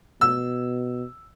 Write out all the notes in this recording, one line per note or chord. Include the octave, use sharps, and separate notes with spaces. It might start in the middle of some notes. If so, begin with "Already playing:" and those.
B2 E6